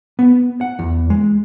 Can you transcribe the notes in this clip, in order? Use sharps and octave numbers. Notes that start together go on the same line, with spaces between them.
B3
F#5
E2
G#3